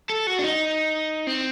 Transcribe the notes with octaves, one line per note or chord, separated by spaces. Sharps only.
A4
F#4
D4
D#4
C4